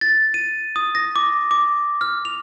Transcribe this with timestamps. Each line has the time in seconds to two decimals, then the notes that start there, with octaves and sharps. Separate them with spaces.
0.01 A6
0.34 D#7
0.76 D#6
0.95 A#6
1.16 D6
1.51 D6
2.01 F6
2.25 F7